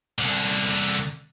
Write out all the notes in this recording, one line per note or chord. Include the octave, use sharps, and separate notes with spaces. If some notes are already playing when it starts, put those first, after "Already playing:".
C2 D3